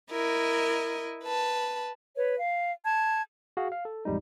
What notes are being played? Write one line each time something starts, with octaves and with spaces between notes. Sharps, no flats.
E4 A#4 D#5
B4 A5
B4 C#5
F5
A5 G#6
F#4 G#4 F5
F5
A4
A1 F2 G3 G#3 D#4